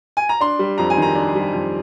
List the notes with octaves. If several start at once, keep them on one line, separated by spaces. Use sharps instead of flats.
G#5
A#5
D4 C6
G3
F2 A#5
G#5
D#3
A#5
D4
G3
F2